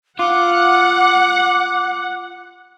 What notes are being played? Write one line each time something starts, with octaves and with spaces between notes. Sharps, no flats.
F4 F#5 D6